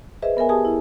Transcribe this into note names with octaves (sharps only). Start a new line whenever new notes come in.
G#4 B4 C5 D#5 E5
B3 A#4 E5 G#5
G4 G#4 G#5 A5 D#6
E4